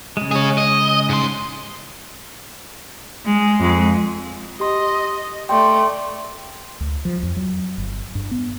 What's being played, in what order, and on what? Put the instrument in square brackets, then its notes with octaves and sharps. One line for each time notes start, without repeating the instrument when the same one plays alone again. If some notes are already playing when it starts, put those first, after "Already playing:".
[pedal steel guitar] C#3 G#3
[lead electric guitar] G#4 C#5
D#5
G#2 C6
[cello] G#3
F2 G#3
[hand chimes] G4 C6 [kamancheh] D#5
[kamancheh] A3 D5 [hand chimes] G5 [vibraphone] C6
[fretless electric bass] D2
F3
F2
F#3
G1
G2
B3